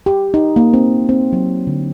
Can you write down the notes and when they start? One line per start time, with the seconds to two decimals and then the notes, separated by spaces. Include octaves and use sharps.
0.06 G4
0.34 D#4
0.56 A#3
0.74 C4
1.09 C4
1.33 F#3
1.67 D3